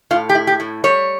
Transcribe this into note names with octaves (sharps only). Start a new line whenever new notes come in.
A2 F4
G4
E4
G4
A2
G3 C#5